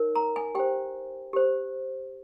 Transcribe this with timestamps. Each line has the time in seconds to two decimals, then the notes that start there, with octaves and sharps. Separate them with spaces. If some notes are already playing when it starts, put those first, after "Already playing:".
Already playing: D#4 A#4 C#5
0.16 A#5
0.36 G#5
0.55 G4 C5 G5
1.33 G4 C5